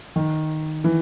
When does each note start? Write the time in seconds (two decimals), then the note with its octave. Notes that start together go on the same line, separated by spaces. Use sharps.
0.16 D#3
0.84 E3